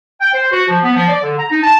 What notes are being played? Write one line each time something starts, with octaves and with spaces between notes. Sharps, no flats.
G5
C5
F#4
F3
B3
F3
D5
D3
A#5
D#4
A5